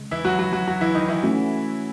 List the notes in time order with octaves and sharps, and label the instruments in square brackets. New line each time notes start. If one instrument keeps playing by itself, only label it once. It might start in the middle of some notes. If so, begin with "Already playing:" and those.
Already playing: [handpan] C#3 G#3
[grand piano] E3 E4
F#3 F#4
F#3 F#4
F#3 F#4
F#3 F#4
E3 E4
D#3 D#4
E3 E4
[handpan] A3 C#4 F#4